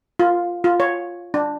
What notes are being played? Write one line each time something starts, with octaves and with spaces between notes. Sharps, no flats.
F4
F4
C#5
D4